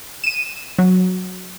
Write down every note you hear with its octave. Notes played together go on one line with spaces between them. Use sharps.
D#7 E7
F#3